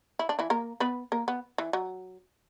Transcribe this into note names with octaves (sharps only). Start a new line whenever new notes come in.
E4
D4
E3 E4
A#3 A#4
B3 B4
A#3 A#4
B3
E3
F#3